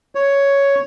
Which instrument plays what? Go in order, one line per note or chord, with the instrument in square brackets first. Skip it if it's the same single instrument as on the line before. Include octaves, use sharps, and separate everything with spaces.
[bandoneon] C#5